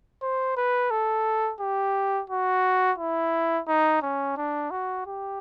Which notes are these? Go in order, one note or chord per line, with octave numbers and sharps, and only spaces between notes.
C5
B4
A4
G4
F#4
E4
D#4
C#4
D4
F#4
G4